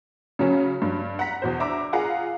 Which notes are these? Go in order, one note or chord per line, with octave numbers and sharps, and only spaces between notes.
C#3 F#3 C#4
G2
F#5 A#5 B6
E2 B2 C5
D4 E5 A#5 D6
F4 G#4 F#5 A#5